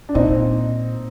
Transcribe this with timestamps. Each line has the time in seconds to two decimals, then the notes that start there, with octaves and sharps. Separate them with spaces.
0.09 D4
0.14 A#2 C4 D#4